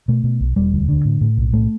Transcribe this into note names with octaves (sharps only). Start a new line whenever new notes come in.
B2 A3
B2
B1
E1 G3
D2
D3
A2
A2
B1
A2 A3